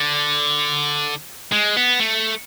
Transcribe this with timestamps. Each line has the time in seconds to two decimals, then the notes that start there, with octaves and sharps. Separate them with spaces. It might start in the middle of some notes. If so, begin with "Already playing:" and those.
Already playing: D3
1.52 G#3
1.76 B3
2.00 A3